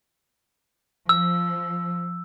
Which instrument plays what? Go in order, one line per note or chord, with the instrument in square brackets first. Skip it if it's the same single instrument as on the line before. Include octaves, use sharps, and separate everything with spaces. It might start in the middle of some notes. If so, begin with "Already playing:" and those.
[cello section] F3 [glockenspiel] E6